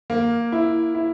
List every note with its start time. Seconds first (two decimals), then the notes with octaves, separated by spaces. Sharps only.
0.10 A#3
0.52 E4
0.95 E4